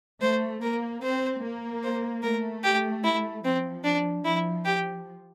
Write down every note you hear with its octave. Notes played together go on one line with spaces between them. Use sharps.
A3 C5
A#3 A#4
C4 C5
A#3
C5
A3 A#4
G4
E4
F3 C4
D4
F3 E4
G4